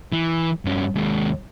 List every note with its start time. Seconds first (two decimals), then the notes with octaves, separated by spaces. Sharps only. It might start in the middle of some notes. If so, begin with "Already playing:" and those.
0.12 E3
0.65 G2 C#4
0.95 D#2 G#3